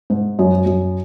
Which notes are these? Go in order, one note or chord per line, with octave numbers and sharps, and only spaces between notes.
G#2
F#2
F#2